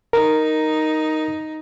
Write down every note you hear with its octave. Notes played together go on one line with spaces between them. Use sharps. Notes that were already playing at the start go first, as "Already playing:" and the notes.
D#4 A#4